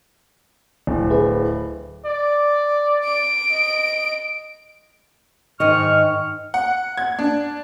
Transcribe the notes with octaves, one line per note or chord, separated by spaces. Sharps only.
D1
E4 G#4 B4
D5
D7
D#5
G#2 D#3 D#5 C#6 F6
F#5
G#6
D4